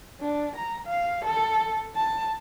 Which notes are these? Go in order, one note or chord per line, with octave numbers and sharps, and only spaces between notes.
D4
A#5
F5
A4
A5